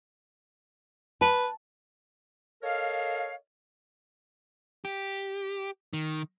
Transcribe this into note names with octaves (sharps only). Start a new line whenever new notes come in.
B4 A5
A4 A#4 C#5 D#5 F5
G4
D#3